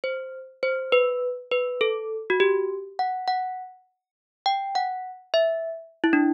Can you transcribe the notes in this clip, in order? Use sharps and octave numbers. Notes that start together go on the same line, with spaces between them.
C5
C5
B4
B4
A4
F#4
G4
F#5
F#5
G5
F#5
E5
E4
D4